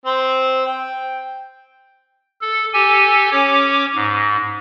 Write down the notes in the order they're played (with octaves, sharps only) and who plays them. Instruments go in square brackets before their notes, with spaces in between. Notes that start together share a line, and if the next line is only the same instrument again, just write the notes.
[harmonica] C4 C5
G5
[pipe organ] A4
G4 A4 G#5
C#4 C#5 D6
G#2